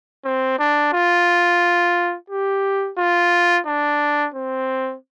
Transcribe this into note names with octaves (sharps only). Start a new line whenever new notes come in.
C4
D4
F4
G4
F4
D4
C4